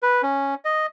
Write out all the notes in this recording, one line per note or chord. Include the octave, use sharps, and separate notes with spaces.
B4
C#4
D#5